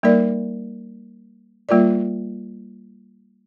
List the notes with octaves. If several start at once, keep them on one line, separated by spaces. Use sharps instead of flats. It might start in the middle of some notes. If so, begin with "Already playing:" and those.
G3 A#3 D#4 A#4 D5
G3 A#3 F4 A#4 D5